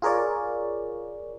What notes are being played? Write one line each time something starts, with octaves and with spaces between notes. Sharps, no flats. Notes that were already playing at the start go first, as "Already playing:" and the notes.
F4 G#4 A#4 C#5 D5